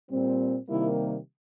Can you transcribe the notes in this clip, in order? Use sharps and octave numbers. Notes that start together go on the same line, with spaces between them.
A#2 G3 C4
C3 D#3 G3 A#3 E4